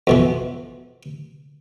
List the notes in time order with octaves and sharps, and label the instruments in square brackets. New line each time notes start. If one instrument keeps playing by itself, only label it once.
[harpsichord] F2 B2 E3